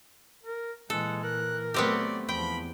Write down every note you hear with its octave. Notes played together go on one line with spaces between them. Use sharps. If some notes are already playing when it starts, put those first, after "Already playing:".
A#4
A#2 E3 G#3 A4 F#5
A#4 F#6
F#3 A3 B3 C4 G4 D5
E2 F3 G5 B5